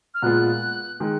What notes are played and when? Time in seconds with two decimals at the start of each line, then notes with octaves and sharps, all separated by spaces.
0.14 F6
0.22 A#2 G#3 B3 F4 F#6
1.00 D#3 G#3